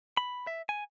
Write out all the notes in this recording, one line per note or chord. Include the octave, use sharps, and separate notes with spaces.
B5
E5
G#5